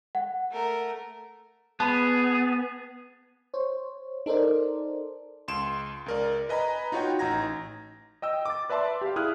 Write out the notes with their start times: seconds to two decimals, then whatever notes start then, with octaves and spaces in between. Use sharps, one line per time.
0.15 F#5
0.51 A3 A#4
1.80 B3 G#4 A5 B5
3.54 C5 C#5
4.26 D#4 A4 A#4 C5 D5
5.48 C#2 C6 D7 E7
6.06 C#2 A#4 D5
6.49 B4 D#5 G#5 A#5 B5
6.92 D#4 F4 F#4 C#5 F#5 G5
7.19 A1 D#4 A#5 G#6 A#6
8.22 D#5 G5 E6
8.46 D6 A6
8.70 B4 D5 E5 A5 C6 E6
9.01 G4 F5
9.16 E4 G#4 D#6 F6 F#6